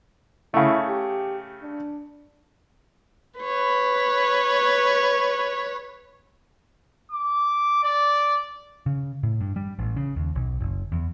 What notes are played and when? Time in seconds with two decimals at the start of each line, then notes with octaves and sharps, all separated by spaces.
0.54 C#3 A3 E4
0.89 G4
1.62 D4
3.39 B4 C#5
7.12 D6
7.83 D5
8.86 C#3
9.23 A2
9.41 G2
9.56 G3
9.79 A1
9.96 C#3
10.16 D#2
10.35 B1
10.61 F#1
10.92 E2